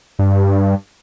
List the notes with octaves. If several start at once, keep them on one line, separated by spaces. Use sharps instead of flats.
G2